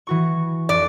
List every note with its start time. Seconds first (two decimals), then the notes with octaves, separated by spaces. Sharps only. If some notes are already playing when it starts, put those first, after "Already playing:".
0.07 E3 F#4 C#6
0.69 F2 D5